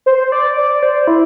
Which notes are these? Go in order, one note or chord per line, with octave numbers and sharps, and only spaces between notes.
C5
D5
D5
C5
E4